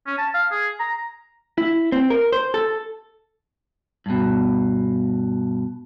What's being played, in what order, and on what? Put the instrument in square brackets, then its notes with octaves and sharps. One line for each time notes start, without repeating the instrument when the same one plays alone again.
[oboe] C#4
A5
F5
G#4
A#5
[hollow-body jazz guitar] E4
C4
A#4
C5
A4
[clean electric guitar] G2 B2